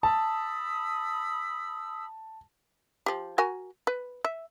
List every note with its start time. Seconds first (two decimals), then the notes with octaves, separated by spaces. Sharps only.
0.03 A5 B5 D#6 E6
3.06 F3 G4
3.38 F#4 A#4 G#5
3.87 B4
4.25 E5